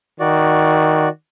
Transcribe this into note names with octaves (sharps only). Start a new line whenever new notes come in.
D#3 F#4 D5